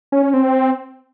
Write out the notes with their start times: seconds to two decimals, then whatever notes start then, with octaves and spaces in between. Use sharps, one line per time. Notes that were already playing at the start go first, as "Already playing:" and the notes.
0.12 C#4
0.23 C#4
0.34 C4